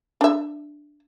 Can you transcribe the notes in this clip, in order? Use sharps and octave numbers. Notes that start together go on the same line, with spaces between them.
D4 E5